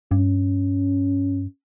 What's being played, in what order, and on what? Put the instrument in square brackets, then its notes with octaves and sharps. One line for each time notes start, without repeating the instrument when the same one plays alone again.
[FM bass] G2 [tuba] C#4